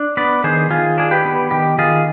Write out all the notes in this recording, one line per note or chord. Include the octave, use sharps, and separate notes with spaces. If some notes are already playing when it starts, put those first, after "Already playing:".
Already playing: D4
B3 B4 D5
D#3 G#4 C5
D#3 F4 G#4
D4 G#4
G4 B4
B3
D#3 G4
D#3 F4 G#4